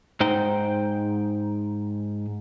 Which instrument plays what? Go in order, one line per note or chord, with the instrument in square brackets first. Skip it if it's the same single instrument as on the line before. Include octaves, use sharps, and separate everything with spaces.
[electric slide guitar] G#2 D#4 C5 G5